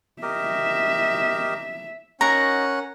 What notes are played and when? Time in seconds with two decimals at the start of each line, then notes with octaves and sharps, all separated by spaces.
0.22 G4 A#4 D#5 E5
2.21 C#4 D#4 F#4 A#4 F#5 A#5